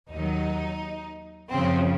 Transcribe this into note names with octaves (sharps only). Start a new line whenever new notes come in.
D#2 D#3 F#3 D#4
F#2 C#3 F3 C4